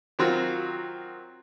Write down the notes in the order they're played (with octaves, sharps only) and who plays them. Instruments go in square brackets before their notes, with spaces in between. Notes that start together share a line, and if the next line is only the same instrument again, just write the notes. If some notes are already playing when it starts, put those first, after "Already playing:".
[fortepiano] D#3 F#3 C4 F4 F#4